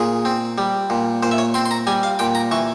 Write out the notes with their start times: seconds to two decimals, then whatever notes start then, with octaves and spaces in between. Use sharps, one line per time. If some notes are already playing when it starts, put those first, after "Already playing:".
Already playing: A#2 G#4
0.25 C4
0.58 G3
0.90 A#2
1.23 A#2 C5
1.31 E5
1.38 C#5
1.54 C4 C6
1.66 C6
1.71 A#5
1.87 G3 G#5
2.03 F5
2.19 A#2 G5
2.35 A#5
2.51 E3 C#6